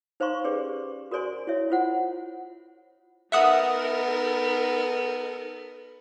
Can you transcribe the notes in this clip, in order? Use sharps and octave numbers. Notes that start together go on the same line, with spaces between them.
D#4 C5 F5 A#5 C6 C#6
C#4 G4 G#4 B4 D5
F#4 A#4 C5 D5 G#5 C6
E4 F#4 C#5 E5
E4 F4 C5 F#5
B3 D#4 A4 A#4 E5 F#5 D#6